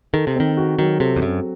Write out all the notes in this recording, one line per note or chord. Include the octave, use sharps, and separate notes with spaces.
D#3 A4
C3
D#3 C4
F#4
D#3 F#3
C3 A4
E2
F#2 C4